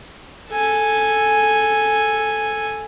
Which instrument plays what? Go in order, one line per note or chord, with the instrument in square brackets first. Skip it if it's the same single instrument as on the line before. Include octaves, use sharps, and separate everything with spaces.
[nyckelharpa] A4 G#5